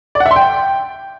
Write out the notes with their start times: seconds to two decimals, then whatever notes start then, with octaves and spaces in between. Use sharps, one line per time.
0.15 D5
0.20 F#5
0.26 E5
0.31 C6
0.36 G5